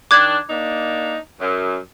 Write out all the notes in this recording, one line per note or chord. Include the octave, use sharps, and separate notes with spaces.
D#3 D4 D6 F#6 G#6
A#3 D4 D#4
F#2